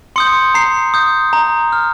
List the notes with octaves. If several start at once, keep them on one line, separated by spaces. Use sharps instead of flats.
C6 D#6 G6 C#7
A#5 C7
D#6 G6
A#5
F6